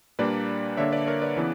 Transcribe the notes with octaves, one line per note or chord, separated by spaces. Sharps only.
A#2 G3 A#3 D4 B4 D5
D3 A#3 D4 C#5 E5
B4 D5
A#4 C#5
B4 D5
C#3 E3 B3